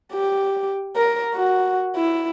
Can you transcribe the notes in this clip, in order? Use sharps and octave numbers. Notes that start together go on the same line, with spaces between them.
G4
A#4
F#4
E4